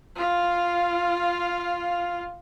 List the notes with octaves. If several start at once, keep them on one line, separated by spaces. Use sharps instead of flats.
F4 F5